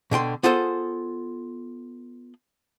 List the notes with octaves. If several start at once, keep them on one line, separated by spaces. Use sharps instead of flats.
B2 D3 G5 C6
B3 F4 G#4 A4 C5